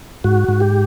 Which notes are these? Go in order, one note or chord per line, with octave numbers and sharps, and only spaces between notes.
G#2 F#4
G#2
G4